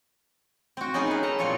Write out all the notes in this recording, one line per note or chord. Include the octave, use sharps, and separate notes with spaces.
C4 F#4
B3 C#4 D#4 F#4 G#4 A#4
E4 B4
A4 A5 A#5
A#2 F#3 C4 F4 G#4 C#5